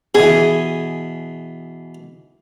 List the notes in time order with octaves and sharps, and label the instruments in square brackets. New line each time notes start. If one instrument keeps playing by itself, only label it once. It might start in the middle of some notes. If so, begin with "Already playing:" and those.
[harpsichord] B2 E3 [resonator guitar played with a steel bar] G#4